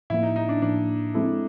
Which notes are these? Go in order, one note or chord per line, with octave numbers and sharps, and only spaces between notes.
A2 F3 A#3 E4
D#4
D#4
D4
A2 F3 A#3 D4
G#3 C4 E4 A4